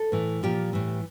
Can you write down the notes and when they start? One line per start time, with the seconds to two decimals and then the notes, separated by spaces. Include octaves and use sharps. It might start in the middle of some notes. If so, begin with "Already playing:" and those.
Already playing: A4
0.12 A2 E3
0.43 A#2 F3 G4
0.73 A2 E3